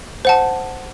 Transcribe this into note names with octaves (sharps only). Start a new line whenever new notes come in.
C5 F#5 A5